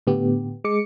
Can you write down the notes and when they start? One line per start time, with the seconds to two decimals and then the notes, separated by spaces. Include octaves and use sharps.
0.07 A2 D3 B3 G4
0.64 G#3 D6 C#7